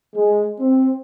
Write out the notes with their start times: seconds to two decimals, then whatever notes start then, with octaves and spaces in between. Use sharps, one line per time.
0.16 G#3
0.60 C4